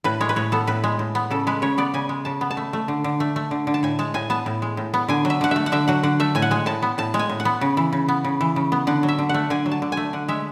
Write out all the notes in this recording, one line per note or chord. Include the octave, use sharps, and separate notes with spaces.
A2 B4
G#3 C#5
B4
A2 C#5
B3 A4
A2 B4
G#3
A2
B3
C#3 A4
G#3 B4
C#3 C#5
B3 D5
C#3 G#5
G#3
C#3 A5
B3
A5
A3
A3
D3
D3
A3
A3
D3
D3
A5
A2 G#5
G#3 A5
A2 G#5
B3 A5
A2
G#3
A2
B3
D3 G#5
F#3
E5
D3 F#5
A3 E5
F#5
D3 E5
F#3 F#5
D3 F#5
A3 E5
A2 G#5
F#5
G#3 G#5
A2 A5
B3
A2 A5
G#3
G#5
A2
F#5
B3
C#3
E3
C#3
B3
C#3
E3
C#3
B3
D3 F#5
F#3
E5
D3
A3 F#5
D3 G#5
F#3
A5
D3
G#5
A3
D3 F#5
G#3 E5